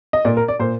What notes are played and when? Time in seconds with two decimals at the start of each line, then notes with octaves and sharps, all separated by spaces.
0.13 D#5
0.25 A#2 D5
0.37 A#4
0.48 D5
0.60 A#2 C5